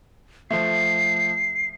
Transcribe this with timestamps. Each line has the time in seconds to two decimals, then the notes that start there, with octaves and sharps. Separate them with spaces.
0.51 F3 A3 C7